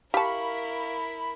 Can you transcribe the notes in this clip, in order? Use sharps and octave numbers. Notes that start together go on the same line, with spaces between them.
E4 G4 A#4 F5 A5 B5 C#6